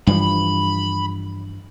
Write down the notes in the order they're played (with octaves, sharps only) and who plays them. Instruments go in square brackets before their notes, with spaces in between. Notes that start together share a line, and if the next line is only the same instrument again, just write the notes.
[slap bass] G2 E3 F3 [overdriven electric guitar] B5